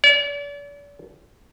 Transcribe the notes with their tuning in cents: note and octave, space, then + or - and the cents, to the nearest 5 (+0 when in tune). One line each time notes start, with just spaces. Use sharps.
D5 -40